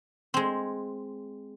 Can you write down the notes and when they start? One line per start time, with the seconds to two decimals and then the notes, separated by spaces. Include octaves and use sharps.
0.34 G#3 C4